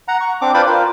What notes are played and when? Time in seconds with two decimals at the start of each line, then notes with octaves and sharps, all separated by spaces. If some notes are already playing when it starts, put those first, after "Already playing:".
0.08 F#5 A#5
0.21 C#6
0.41 C4 D4 D6
0.54 F4 B4 C5 D5 B5 D6
0.67 F4 A#4